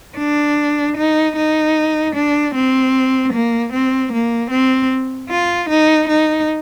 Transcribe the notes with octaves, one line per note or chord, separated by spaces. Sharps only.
D4
D#4
D#4
D4
C4
A#3
C4
A#3
C4
F4
D#4
D#4